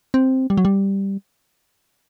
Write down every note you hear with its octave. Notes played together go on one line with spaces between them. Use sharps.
C4
G3
F#3
G3